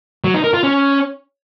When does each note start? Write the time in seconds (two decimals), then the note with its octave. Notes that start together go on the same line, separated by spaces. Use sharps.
0.24 F#3
0.34 D#4
0.44 A#4
0.54 F4
0.64 C#4